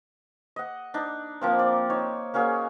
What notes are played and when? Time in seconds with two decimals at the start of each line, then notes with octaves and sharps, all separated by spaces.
0.56 D#5 F#5
0.94 D4 D#4
1.41 F3 A#3 C4
1.59 D5
1.90 D#4 C5 C#5
2.34 A#3 C#4 F#4 G#4